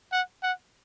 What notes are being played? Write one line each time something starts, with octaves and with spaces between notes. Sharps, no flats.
F#5
F#5